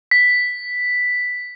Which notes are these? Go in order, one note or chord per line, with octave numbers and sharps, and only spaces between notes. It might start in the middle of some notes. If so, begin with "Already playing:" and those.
B6